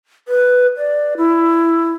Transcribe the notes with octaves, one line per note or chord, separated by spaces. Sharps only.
B4
D5
E4